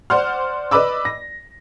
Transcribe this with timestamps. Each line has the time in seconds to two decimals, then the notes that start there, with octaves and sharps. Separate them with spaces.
0.10 C5 D5 F#5 C6 F6
0.71 B4 D5 D#5 B5 D6 E6
1.05 A#6